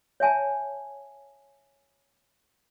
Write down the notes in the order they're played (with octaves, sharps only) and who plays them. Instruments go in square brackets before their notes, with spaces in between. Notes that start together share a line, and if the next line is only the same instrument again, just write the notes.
[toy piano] C#5 E5 G#5 A5